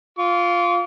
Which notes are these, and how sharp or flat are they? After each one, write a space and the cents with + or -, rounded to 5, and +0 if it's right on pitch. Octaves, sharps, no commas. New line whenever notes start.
F4 +0 D6 -45